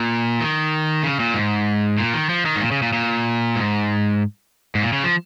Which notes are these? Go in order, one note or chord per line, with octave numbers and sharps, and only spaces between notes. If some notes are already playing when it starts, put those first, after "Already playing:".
Already playing: A#2
D#3
C#3
A#2
G#2
A#2
D#3
F3
D#3
G#2
A#2
C#3
A#2
A#2
G#2
G#2
A#2
C#3
F3